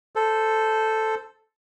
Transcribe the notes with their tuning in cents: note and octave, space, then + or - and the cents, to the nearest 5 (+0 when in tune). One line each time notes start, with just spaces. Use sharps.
A4 +0 C5 -10